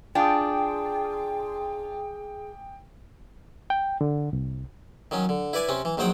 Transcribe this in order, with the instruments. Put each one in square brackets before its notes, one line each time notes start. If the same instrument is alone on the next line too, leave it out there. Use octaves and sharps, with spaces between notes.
[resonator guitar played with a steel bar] D4 F4 [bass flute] G#4 [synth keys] G5 [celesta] G#5 D6 D#6
[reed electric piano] G5
D3
C2
[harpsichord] D#3 F#3 C#4
D3
E4 B4 D5 G#5
C3 C4 C#4
E3
A#1 D#3 F#3 C5 F#5 G5